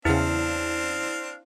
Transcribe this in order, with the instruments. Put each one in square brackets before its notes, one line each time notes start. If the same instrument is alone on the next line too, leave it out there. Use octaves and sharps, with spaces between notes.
[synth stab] E2 C#3 [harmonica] C4 D4 F5 [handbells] E4